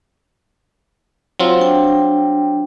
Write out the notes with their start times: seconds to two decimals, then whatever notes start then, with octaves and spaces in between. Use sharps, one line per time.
1.40 F#3 C4 F4
1.59 D4 G5